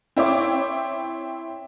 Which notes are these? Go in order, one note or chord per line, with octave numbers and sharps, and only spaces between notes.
C4 E4 C#5 D6